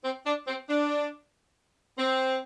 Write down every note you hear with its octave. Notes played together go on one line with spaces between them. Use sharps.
C4
D4
C4
D4
C4